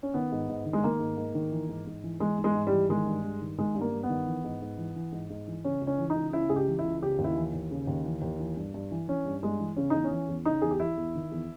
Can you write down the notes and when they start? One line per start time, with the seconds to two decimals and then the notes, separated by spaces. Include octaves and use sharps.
0.03 C#4
0.14 D#3 B3
0.32 G#2
0.49 G#2
0.65 D#3
0.73 G#3
0.84 D#3 A#3
1.00 G#2
1.17 G#2
1.34 D#3
1.52 E3
1.69 G#2
1.87 G#2
2.04 E3
2.20 E3 G#3
2.38 G#2
2.44 G#3
2.55 G#2
2.67 G3
2.72 E3
2.89 D#3 G#3
3.06 G2
3.24 G2
3.41 D#3
3.58 D#3 G#3
3.75 G2
3.81 A#3
3.92 G2
4.03 B3
4.09 D#3
4.26 E3
4.44 G#2
4.62 G#2
4.78 E3
4.96 E3
5.12 G#2
5.30 G#2
5.48 E3
5.65 C#3 C#4
5.81 C#2
5.87 C#4
5.98 E3
6.10 D#4
6.16 C#2
6.33 C#3 E4
6.49 C#2 G#4
6.56 G4
6.68 E3
6.79 E4
6.84 C#2
7.02 C#3 G4
7.19 D#2
7.24 E4
7.36 E3
7.53 D#2
7.71 C#3
7.87 D#2
8.05 E3
8.22 D#2
8.40 E3
8.57 G2
8.74 G2
8.91 E3
9.08 E3 C#4
9.25 G2
9.43 G2 G#3
9.60 E3
9.76 C#3 C#4
9.90 E2 D#4
10.04 C#4
10.11 E3
10.28 E2
10.45 C#3 D#4
10.62 E2 G#4
10.71 G4
10.80 E3 E4
10.97 E2
11.15 D#3
11.32 E2